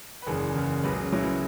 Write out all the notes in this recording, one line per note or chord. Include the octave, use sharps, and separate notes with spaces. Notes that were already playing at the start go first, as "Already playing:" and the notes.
B4
F#1 E2 C#3 G#4
F#1 E2 C#3
C#2 B2 F#3 B4
G#4
C#4
C#2 B2 F#3 E4